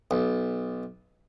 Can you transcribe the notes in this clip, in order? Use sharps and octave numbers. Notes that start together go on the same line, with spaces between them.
B1